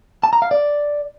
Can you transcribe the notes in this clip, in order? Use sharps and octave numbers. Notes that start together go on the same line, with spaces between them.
A5
A#5
F5
D5